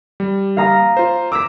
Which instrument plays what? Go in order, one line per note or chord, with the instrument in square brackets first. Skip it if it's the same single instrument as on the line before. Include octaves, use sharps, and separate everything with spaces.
[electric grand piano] G3
[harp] F5 A#5 D#6
[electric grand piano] F4 C5
[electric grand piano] A#5 D6 [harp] E6 B6